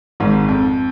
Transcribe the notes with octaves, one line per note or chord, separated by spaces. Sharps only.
G#1 G#2
F2